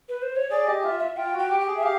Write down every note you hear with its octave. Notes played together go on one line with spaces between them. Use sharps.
B4
C5
C#5
G#4 D5
G4 D#5
F4 E5
E5
F4 G5
F#4
G5
G4
G5
G#4
E5
G4 F5